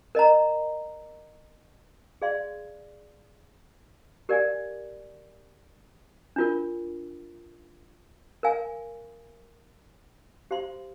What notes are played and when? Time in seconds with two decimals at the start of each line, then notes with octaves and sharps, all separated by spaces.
0.15 A#4 D#5 A#5
2.22 G#4 D5 F5 C6
4.29 G4 A#4 D5 F5 G#5
6.36 D4 F4 A#4
8.43 A#4 F5 G#5
10.51 G4 C5 F5 C6